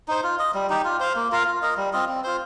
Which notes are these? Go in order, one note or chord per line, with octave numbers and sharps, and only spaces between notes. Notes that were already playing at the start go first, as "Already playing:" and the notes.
D#4 C5
F4
D#5
G3
D#4 G4
F4
C5 F5
A#3
F4 A#4 F5
F4
A#4 D#5
G3
C4 F4 D#5
C4
F4 C5